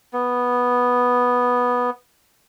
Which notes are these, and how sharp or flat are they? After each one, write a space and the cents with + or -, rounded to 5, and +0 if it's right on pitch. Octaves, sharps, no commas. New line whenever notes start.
B3 -5